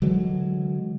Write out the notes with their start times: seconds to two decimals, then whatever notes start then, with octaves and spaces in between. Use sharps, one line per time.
0.02 D3 E3 F#3 G#3